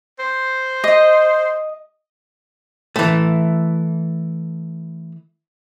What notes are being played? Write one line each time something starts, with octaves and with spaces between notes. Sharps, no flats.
C5
D#5
E3 A3